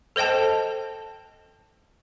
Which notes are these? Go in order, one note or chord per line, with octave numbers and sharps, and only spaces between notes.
A4 C5 D#5 G5 A5